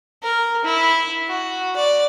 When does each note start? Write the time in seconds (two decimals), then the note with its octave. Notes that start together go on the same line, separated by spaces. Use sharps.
0.23 A#4
0.64 E4
1.28 F#4
1.76 D5